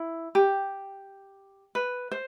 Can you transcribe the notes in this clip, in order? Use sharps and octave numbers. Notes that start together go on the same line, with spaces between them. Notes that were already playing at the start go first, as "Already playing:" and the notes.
Already playing: E4
G4
B4
C5